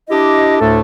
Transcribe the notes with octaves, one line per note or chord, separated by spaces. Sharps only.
D4 E4 G4 D#5
D2 A2 A3 D4 A4